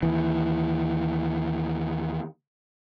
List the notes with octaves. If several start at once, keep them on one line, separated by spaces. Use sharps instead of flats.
D#2 E3